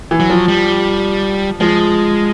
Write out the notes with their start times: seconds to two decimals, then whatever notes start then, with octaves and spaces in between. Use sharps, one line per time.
0.11 E3
0.20 F#3
0.30 F3
0.48 G3
1.60 F3 G#3